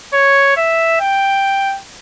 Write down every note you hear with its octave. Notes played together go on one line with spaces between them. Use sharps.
C#5
E5
G5